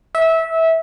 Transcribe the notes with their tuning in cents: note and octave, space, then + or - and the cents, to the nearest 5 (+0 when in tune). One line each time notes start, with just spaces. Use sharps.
E5 -20